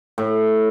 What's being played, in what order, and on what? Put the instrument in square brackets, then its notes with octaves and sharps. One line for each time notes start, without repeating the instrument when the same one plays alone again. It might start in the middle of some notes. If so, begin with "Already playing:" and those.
[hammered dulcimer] A2